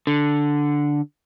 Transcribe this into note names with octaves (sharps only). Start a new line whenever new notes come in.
D3